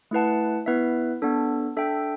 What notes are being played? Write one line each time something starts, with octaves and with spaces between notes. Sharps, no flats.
A3 E4 B4 F#5 A5
B3 E4 B4 E5
B3 D4 A4
D4 A4 E5 G5